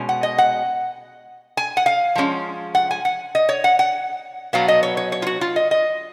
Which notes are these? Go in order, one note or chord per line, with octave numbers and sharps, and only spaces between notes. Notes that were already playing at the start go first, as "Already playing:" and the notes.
Already playing: B2 G#3 C#4
F#5
D#5
F#5
G#5
F#5
F5
F3 G#3 C#4
F#5
G#5
F#5
D#5
C#5
F#5
F#5
B2 F#3 B3 F5
D#5
C#5
C#5
C#5
F4
F#4
F4
D#5
D#5